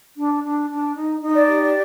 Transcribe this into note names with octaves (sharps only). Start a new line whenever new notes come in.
D4
D4
D4
D#4
D#4
D5
G4